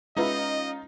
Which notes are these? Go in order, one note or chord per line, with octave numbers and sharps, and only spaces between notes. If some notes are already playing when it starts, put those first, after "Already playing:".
G#3 C#4 D#4 F4 B4 D#5 E5